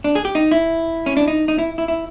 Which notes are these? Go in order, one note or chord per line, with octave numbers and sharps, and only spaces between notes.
D4
G#4
G4
D#4
E4
C#4
D4
D#4
D#4
E4
E4
E4